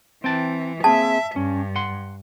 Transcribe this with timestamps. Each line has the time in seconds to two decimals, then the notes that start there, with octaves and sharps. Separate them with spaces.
0.24 E3 C4 G5 A5
0.84 A#3 C4 G#4 E5 A5
1.36 G2 C#4
1.76 F#5 C6